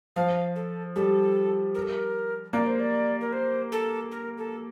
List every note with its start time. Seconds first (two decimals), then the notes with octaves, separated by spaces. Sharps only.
0.16 F3 F5
0.56 A4
0.96 G3 A4
1.75 A#4
1.82 A4
1.89 A#4
2.53 A#3 D5
2.67 C5
2.80 D5
3.21 A#4
3.33 C5
3.72 A4
4.11 A#4
4.38 A4